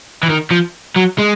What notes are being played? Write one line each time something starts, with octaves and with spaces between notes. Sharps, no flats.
E3
D#3
F3
F#3
G#3